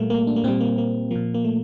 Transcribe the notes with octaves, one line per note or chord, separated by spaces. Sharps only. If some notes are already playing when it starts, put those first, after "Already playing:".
Already playing: A#2 G3 A3 A#3
A#3
D4
A#3
A#2 G3 C4
A#3
A#3
A#2 F3 A#3
A#3
A3